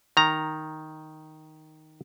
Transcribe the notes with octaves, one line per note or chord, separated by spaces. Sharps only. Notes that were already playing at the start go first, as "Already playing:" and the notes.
D#3 A#5